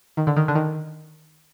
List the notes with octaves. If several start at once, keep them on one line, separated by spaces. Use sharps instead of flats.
D#3
D3
D#3
D3
D#3